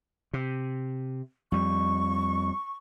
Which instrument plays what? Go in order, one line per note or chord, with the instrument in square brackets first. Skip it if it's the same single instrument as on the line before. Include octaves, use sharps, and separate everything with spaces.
[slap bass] C3
[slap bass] F2 G3 [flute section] C#6